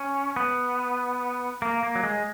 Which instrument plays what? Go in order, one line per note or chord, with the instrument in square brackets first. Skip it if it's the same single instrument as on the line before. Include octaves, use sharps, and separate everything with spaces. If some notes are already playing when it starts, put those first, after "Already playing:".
Already playing: [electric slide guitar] C#4
B3
A#3
A#3
F#3
G#3